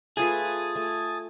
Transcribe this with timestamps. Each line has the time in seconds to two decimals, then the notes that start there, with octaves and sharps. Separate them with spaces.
0.17 A3 F4 G#4 B4 G#5 A5 D#6
0.76 A3